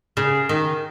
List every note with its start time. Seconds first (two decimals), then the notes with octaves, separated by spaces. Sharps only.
0.17 C#3
0.49 D#3